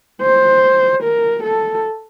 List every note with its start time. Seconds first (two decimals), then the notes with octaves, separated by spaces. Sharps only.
0.22 C5
1.02 A#4
1.43 A4